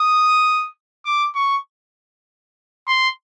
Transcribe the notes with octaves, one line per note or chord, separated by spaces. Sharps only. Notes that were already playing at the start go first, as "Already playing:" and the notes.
Already playing: D#6
D6
C#6
C6